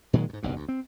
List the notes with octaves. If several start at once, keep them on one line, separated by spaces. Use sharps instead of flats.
A#2 D#3 F#3 G#3
F2 G#2
F#1 B1 G2
D2
C4